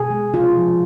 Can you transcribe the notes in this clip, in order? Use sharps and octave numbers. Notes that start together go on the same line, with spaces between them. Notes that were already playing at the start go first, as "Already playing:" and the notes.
Already playing: B2 G#4
G#3
C3 F4
F3